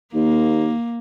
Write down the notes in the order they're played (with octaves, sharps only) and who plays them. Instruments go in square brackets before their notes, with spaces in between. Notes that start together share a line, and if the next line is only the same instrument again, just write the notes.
[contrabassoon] D#2 [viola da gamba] A#3